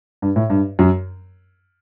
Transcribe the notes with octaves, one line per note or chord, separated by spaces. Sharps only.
G2
A2
G2
F#2